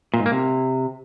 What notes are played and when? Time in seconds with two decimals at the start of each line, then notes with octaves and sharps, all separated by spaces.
0.14 A#2
0.20 G#2
0.26 A#3
0.32 C3